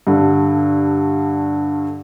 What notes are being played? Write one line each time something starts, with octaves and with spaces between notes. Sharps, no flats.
G2 D3